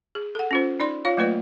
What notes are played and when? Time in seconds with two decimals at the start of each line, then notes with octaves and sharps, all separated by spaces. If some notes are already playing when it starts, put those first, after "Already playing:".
0.15 G#4
0.35 A4 F#5
0.51 C#4 F4 C5
0.80 D#4 D5 C6
1.05 F4 C#5 F5
1.17 F#3 A3 A#3 F4 B4 D5